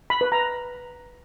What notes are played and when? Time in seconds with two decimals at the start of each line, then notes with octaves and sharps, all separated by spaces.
0.10 B5
0.21 B4
0.32 A#5